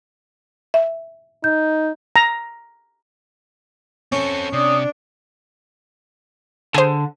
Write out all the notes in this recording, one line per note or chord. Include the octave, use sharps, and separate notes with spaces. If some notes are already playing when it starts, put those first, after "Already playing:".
E5
D#4 G6
A#5
C4 C#4 A4
C3 D4 D#6
D3 G#4 C5